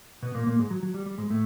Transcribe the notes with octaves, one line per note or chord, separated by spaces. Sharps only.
B2 B3
A#2 A#3
A#2 A#3
G#2 G#3
F#3
F#3
G3
G3
G#2 G#3
A2 A3